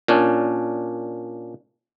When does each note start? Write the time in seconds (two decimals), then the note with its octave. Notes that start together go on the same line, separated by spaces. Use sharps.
0.08 A#2 C#4 D4